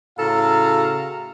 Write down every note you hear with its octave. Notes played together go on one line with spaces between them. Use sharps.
A2 C#3 F#4 A4 F5 A#5